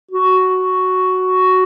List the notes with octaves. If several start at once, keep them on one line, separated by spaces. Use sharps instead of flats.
F#4